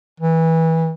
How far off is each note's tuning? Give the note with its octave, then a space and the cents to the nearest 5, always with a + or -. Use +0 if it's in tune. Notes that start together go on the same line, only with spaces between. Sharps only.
E3 -20